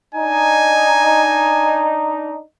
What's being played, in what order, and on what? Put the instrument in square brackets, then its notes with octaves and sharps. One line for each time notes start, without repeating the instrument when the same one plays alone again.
[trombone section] D4 D#4 [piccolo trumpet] G#5